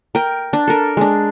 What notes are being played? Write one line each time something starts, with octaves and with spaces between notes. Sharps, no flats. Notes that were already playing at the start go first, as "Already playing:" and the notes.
A#4 G5
D4
A4 A#4
G#3 D4